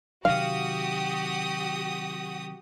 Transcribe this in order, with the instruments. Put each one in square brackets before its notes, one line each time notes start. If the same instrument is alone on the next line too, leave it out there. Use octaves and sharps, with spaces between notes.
[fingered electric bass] C3 D#3 F#3 [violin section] F#4 G4 D#6 [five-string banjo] F5